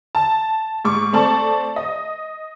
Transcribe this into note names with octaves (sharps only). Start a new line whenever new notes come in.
A5
G#2 C#6 D6
A3 C4 D5 A5 C#6
D#5